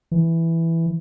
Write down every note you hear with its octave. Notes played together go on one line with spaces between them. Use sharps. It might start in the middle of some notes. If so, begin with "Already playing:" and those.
E3